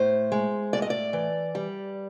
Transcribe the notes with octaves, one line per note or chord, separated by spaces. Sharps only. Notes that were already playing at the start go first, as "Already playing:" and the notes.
Already playing: A2 C5
G#3
A2 D5
D#5
D5
E3
G3